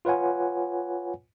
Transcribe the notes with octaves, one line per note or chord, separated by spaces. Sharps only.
F4 B4 C#5 F#5 G#5